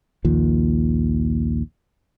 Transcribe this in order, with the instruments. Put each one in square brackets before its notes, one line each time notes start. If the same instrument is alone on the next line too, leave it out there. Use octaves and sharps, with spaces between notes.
[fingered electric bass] A#1 D#2 A#2